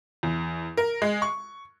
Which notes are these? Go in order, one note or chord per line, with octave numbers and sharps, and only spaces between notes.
E2
A#4
G#3
C#6